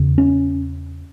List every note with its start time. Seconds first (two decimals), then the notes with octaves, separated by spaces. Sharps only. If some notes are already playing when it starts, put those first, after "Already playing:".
Already playing: E2 C#3
0.18 C#4